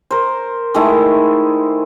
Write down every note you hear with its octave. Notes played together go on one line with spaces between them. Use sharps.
A#4 C5
D#3 G#3 A3 E4